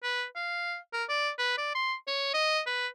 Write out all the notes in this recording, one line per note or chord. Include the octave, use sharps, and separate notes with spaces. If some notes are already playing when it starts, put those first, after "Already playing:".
B4
F5
A#4
D5
B4
D5
C6
C#5
D#5
B4